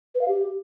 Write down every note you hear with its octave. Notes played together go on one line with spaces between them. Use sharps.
B4
F5
G4